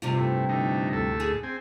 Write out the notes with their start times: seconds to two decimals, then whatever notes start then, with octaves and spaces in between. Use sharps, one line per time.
0.02 G2 C3 F4
0.17 A2
0.49 A2 D3 D#4
0.93 D2 A2 A4
1.20 G#4
1.43 C4 G#5